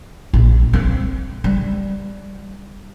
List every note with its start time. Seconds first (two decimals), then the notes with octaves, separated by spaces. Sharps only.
0.33 A#1
0.73 C4
1.44 G3